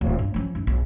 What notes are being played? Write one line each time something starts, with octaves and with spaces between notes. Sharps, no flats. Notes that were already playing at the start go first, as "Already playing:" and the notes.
D1
G2
F3 C#4
F#2 D#4
A#1